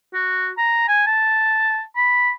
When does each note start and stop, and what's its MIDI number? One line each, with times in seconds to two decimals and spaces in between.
0.14 0.50 66
0.58 0.86 82
0.88 1.04 80
1.07 1.82 81
1.96 2.31 83